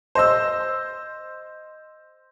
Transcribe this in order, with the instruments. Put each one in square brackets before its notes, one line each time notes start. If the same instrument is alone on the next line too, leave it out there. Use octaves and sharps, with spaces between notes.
[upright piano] C5 D#5 E6